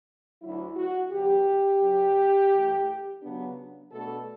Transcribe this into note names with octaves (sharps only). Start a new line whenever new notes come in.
D2 D3 F#3 E4
F#4
E2 D3 F#3 G4
F#2 C#3 F#3
G2 E3 A3
C#3 F#3 B3 D4
B2 A3 D4 A4